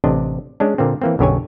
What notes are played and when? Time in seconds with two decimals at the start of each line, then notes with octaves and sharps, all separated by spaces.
0.04 A1 C3 D4 D#5
0.60 G#3 C#4 D4
0.78 A#2 D3 A#3 C4
1.02 E3 A#3 C4
1.19 B1 F#2 D3 G4 C#5 G#5